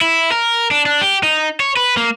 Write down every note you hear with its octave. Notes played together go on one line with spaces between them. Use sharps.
E4
A#4
D4
D4
G4
D#4
C#5
B4
A#3